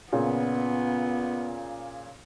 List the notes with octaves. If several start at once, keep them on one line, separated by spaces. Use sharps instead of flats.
A#2 C#3 B3